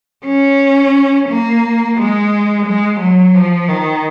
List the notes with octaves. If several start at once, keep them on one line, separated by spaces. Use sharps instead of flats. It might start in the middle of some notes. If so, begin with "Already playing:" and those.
C#4
A#3
G#3
G#3
F#3
F3
D#3